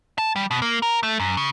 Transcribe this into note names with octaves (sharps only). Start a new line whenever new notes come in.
A5
G3
B2
A#3
A#4
A3
F#2
C#3